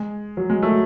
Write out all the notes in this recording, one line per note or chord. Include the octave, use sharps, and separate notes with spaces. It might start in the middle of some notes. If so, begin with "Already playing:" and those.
Already playing: G#3
F#3
G#3
F#3 A3